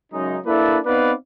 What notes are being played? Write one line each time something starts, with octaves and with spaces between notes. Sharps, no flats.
F#2 C#3 F#3 G#3 D#4
A#3 D4 E4 A4 B4 D5
B3 C4 D#4 B4 D5 F5